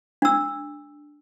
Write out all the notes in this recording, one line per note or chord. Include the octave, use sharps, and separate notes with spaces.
D4 E6